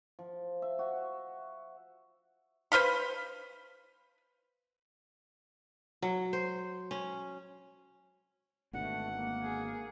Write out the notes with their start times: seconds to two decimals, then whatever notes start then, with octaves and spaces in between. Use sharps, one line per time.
0.19 F3
0.62 E5
0.79 F#4
2.72 B4 C5 F5 B5
6.02 F#3
6.33 C5
6.91 C#4
8.73 G#1 B2 D3 A3 F#5
9.15 A#3
9.44 G#4